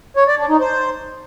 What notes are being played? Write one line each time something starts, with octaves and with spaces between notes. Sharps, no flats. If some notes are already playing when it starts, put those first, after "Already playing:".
C#5
D5
D4
D#4
C5